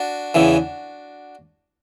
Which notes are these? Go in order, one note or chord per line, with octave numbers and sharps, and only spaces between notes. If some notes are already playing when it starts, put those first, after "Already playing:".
Already playing: D4 F#4
E2 C#3 E3